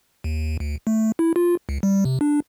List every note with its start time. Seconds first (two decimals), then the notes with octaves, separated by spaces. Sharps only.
0.24 D#2
0.60 D2
0.87 A3
1.19 E4
1.36 F4
1.69 C#2
1.83 G3
2.05 C3
2.21 D4